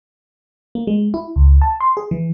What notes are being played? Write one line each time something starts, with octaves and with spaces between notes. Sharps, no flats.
A#3
G#3
E4
C#2
A5
C6
G#4
E3